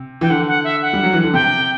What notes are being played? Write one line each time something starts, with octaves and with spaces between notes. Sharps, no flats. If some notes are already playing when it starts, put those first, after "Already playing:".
Already playing: C3
E3 G5
D3 F#5
F#5
E5
F#5
G3
F#3
E3
D3
C3 G5